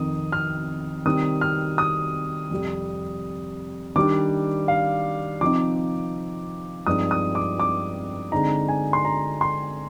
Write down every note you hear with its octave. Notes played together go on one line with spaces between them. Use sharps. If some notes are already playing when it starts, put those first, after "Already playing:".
Already playing: F2 C3 D#3 D#6
F6
C3 D#3 G3 C4 D#6
F6
D#6
F2 C3 G3
D#3 G3 D4 D6
F5
C3 F3 C4 D#4 D6
G2 F3 G#3 C4 D#4 D#6
D#6
D6
D6
D3 G#3 C4 D#4 A#5
G#5
C6
A#5
C6